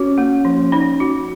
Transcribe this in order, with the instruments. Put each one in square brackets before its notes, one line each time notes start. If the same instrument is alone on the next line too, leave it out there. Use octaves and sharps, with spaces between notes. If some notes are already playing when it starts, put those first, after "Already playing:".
Already playing: [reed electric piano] C#4 [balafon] F#4
[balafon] A#3
F3
D#4
F#4